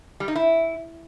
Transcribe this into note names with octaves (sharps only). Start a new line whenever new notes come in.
G3
D#4
E4